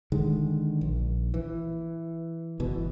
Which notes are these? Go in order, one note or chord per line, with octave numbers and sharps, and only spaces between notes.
D3 D#3 G#3
A#1
E3
G1 B2 E3